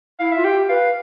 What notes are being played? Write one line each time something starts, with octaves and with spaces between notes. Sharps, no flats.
E4 F5
F4 E5
G4 G5
B4 F5